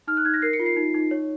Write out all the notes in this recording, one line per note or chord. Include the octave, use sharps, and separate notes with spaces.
D#4 F6
F#6
D#4 G#6
A#6
A#4 C7
C#7
F4
C7
D#4
D#4
C#5